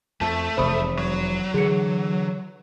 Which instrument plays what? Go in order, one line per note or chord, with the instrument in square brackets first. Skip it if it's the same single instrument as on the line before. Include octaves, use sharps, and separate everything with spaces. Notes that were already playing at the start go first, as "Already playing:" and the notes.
[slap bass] F2 [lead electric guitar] A3 [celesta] A5
[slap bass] F1 E2 C3 [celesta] C5 B5 D#6
[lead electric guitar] F#3
[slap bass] D3 E3 [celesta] G#4 C#7